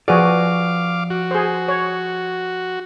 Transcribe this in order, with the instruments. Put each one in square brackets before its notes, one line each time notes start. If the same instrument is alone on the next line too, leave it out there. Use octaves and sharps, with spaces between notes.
[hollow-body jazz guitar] F3 B4 D5 [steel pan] F#4 G#4 [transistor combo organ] F5 D6
[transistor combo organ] F#4
[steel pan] G#4 C5
C#5